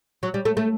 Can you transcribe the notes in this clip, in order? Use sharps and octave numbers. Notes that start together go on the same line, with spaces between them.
F#3
G3
A3
A3